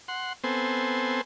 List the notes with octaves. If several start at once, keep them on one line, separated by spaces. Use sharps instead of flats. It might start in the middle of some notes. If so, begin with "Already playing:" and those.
F#5 C6
B3 C4 A4 C5 G#5